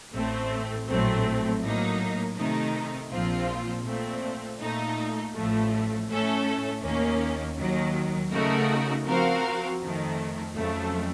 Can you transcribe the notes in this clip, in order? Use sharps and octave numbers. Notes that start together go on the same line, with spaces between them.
A1 A2 A3 C4
A#1 A2 F#3 A3 C4
A2 F#3 A#3 D#4
C3 D#3 A3 D#4
A#1 A#2 F3 C4 F4
A#2 A3 C4
A#2 A3 D#4
A1 A2 F3 A3
A2 A3 C#4 A4
D#2 D#3 A#3 C#4
D#2 D#3 F#3
C#3 A3 D#4 F#4 A#4
F3 C4 F#4 A#4 F5
F2 D#3 A3
F2 C#3 F#3 A3